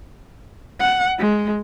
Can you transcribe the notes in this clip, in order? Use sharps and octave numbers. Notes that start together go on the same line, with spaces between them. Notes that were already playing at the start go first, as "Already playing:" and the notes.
F#5
G#3